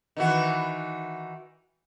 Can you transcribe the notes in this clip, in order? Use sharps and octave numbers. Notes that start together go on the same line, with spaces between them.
D#3 E3 F#4